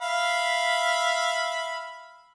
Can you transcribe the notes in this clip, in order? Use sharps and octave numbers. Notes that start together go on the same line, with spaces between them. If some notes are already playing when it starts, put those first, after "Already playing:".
E5 F5 B5